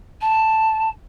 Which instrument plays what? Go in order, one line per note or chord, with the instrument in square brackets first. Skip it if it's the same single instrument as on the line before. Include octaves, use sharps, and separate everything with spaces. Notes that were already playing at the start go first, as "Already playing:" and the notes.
[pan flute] A5